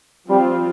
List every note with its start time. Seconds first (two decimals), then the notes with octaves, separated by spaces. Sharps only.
0.29 F3 G3 C4 F4